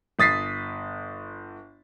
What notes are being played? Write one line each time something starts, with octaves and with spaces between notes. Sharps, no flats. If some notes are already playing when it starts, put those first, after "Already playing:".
G1 D#6 A6 B6 C7